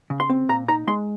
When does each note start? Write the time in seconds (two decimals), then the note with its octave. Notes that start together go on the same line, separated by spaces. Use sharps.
0.10 C#3
0.20 C6
0.30 C4
0.49 A#2 A#5
0.68 D#4 A#5
0.87 G#3 C6